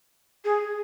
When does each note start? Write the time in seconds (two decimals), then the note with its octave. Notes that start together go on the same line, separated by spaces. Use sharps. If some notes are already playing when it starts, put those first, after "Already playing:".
0.45 G#4